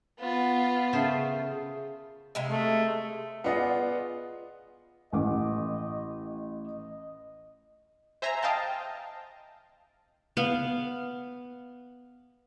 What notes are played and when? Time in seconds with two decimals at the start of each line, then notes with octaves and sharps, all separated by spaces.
0.19 B3 F4
0.93 C#3 A3 C5
2.35 C3 G#3 A#3
2.51 A3
3.44 B3 F4 G#4 D5 D#5 F#5
5.13 A1 D#5 F#5 D6
6.66 D#5
8.22 C5 E5 G#5 A#5
8.43 D#5 F5 G5 A5
10.37 B3 F5